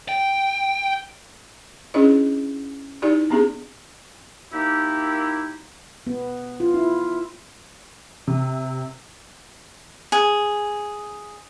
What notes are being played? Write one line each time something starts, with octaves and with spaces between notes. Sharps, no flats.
G5
C#4 D4 E4 G#4 C#5 D#5
D#4 E4 G4 D5
B3 C4 D4 G4 G#4
A#3 D#4 E4 G4
B3
F4
E4
C3
G#4